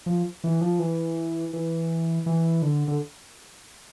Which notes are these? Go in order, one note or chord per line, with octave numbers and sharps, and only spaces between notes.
F3
E3
F3
E3
E3
E3
D3
D3